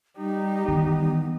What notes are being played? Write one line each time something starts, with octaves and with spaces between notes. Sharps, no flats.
G3 D#4 G4
D#3 E3 B3